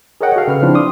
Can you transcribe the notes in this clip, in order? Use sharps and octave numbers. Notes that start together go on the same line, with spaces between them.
G#4 A#4 C#5 D#5 F#5 G5
F#4 A4 F5
C#3 B4 F6
F3 C4 D4 E4
C6 D6 D#6